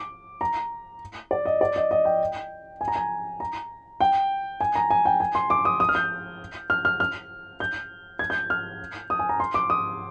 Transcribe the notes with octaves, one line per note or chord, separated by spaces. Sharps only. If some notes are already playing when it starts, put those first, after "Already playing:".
Already playing: D6
A#5
D5
D#5
D5
D#5
D#5
G5
G#5
A#5
G#5
A#5
G5
G#5
A#5
G#5
G5
G#5
C6
D6
D#6
D#6
F6
G6
F6
F6
F6
G6
G#6
G6
F6
D#6
G#5
A#5
C6
D6
D#6